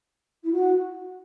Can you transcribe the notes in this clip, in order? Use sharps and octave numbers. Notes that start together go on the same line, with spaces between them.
E4
F#4